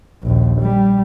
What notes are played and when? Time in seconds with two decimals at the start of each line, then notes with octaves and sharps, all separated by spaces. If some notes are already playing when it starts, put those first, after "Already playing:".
0.24 A#1 D#2
0.61 G3